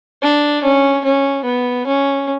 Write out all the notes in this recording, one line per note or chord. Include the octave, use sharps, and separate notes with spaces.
D4
C#4
C#4
B3
C#4